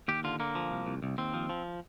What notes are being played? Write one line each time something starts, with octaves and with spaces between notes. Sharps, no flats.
D#2 G4
D3 F4
D3 A#3
F3
C2
C2
C2
D#2 C4
F3
F3